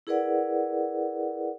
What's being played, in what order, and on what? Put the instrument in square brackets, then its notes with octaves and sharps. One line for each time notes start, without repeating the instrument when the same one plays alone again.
[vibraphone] E4 G#4 A#4 B4 D5 F#5